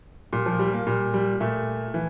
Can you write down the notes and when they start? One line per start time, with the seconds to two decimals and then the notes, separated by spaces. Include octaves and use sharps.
0.32 A#2 G3
0.46 F3
0.59 G3
0.73 A#3
0.87 A#2 G3
1.14 G3
1.40 A#2 A3
1.94 E3